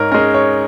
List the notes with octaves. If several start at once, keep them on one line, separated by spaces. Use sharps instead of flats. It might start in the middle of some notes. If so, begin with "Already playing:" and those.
Already playing: G#2 A#4 C#5
G#3 C#4 A#4
C#5